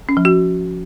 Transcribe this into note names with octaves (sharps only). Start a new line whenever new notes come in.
C#4
F3
F#4